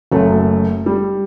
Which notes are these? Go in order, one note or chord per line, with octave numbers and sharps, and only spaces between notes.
F#1 F#2 F#3 A3
G3